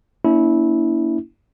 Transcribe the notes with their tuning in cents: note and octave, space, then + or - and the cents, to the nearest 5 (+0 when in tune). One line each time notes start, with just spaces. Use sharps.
A#3 +0 C#4 +45 E4 -15